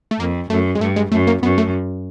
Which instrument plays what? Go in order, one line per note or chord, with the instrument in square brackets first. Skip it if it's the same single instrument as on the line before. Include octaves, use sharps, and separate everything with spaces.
[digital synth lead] A3
[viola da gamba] F2 [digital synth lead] A#3
[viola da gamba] F#2 [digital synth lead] A3
[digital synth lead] G#3
[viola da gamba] G2 [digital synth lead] A3
[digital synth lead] G#3
[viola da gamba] F#2 [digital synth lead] A3
[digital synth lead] A#3
[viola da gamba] F#2 [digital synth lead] B3
[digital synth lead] A3